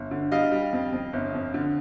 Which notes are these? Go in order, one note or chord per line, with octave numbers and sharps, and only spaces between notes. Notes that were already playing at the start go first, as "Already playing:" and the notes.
Already playing: G1
D3
G3 D#5 F5
G3
F2
F2
G1
F2
D3